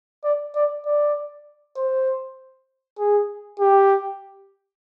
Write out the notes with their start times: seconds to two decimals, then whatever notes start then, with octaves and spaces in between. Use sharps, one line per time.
0.24 D5
0.55 D5
0.86 D5
1.77 C5
2.99 G#4
3.60 G4